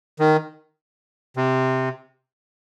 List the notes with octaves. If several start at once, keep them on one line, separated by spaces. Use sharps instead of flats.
D#3
C3